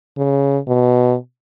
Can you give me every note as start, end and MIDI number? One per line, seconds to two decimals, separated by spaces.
0.17 0.58 49
0.68 1.15 47